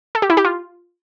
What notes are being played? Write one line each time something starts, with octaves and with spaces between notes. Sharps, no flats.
A4
G4
E4
G4
F4